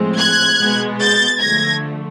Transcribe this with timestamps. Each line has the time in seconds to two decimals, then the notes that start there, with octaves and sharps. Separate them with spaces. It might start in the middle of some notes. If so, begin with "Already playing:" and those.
Already playing: A2 F3 G#3 C4
0.18 F#6 G#6
0.59 B2 G#3 B3
1.00 G6 A6
1.40 D3 F3 A3 G#6 A#6